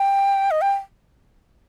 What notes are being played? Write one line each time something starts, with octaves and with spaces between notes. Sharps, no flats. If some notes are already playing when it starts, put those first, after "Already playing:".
Already playing: G5
D#5
G5